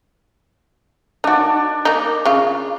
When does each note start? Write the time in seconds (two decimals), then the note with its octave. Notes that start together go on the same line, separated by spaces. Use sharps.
1.24 D4 D#4 F#4 D5
1.85 A#3 D#4
2.25 C#3 F4